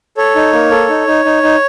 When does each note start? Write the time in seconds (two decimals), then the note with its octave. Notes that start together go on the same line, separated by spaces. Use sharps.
0.17 A4 C#5
0.35 D#4
0.53 A#3
0.71 A4
0.89 D#4
1.07 D#4
1.25 D#4
1.43 D#4